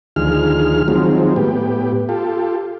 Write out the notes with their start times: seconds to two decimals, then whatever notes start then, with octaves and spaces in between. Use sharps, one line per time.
0.16 D2 D#3 F3 G#4 F6
0.88 D#3 F3 F#3 G#3 C4
1.36 A2 B3 G4
2.09 F4 G4 A4